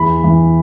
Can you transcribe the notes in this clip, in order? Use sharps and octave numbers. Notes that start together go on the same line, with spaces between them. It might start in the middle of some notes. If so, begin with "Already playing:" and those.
Already playing: E2 E3 B5
E3